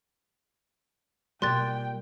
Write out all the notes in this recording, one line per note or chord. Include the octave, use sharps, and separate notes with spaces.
B2 G3 A#3 F4 G5 C6 F#6 A6